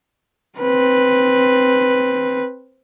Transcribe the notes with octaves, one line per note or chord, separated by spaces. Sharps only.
C4 B4